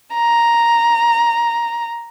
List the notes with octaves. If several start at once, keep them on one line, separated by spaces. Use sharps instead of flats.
A#5